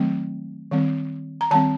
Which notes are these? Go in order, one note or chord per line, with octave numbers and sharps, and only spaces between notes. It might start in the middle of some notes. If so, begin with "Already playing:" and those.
Already playing: D#3 F#3 A3 C4
D#3 G3 C4
A#5
D#3 G3 C4 A5